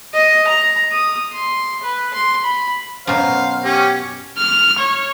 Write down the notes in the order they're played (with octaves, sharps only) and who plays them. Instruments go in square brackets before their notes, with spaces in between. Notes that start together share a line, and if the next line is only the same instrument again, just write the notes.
[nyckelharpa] D#5
A#5
D#6
C6
B4
C6
B5
[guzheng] F#2 B2 [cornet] C5 [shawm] F5
[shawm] C#4 [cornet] G4
[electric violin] F6
C#5